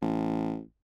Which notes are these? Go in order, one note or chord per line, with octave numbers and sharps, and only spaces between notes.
A1